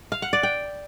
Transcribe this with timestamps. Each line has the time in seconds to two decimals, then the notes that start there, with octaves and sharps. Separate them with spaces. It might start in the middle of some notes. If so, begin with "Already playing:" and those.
0.12 F5
0.22 F#5
0.33 D5
0.43 G5